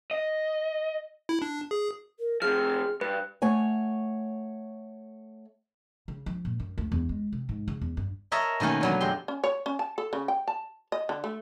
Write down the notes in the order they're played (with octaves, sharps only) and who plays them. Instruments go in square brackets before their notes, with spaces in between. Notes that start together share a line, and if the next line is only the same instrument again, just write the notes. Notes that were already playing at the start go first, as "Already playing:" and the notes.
[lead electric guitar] D#5
[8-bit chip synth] E4
D4
G#4
[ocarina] A#4
[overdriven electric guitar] C3 F3 [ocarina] G#4 [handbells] F6
[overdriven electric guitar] G2 [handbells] B4
[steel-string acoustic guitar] A3 C#5 F#5 G#5
[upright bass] C#3
F3
A#2
F#2
D2
E2
G#3
C3
G#2
C#3
E2
G2
[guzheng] A#4 C#5 D#5 E5 A5 A#5
B2 D#3 A3 A#3 C#4
D3 F#3 B3
F2 G#3 G4 C6
[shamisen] C#4
C#5
C#4
A5
A4
C#3
G5
A5
D#5
D3
A3